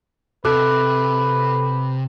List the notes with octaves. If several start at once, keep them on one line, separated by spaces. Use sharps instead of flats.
C3 A4 B4 D6 F#6